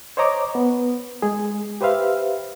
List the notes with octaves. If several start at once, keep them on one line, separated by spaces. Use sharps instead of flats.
C5 C#5 D#5 A#5 D6
B3
G#3 G#4
G4 B4 C5 E5 F5